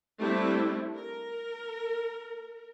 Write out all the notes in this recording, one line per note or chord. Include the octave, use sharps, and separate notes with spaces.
G3 A3 C4 D4 E4
A#4